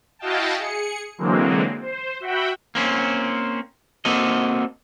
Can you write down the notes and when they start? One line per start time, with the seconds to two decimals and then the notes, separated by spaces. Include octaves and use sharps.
0.19 E4 F#4 D#5 F5 G5 A5
0.57 G#4 C#7
1.18 D3 E3 F#3 G#3 A#3 C4
1.81 C5
2.20 F#4 E5 F#5 G5 B5
2.75 A#3 C4 C#4
4.05 A#3 C4 F#4 A4 D#5